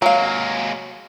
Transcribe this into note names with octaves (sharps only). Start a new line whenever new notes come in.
F#3 G#3 A#3 F5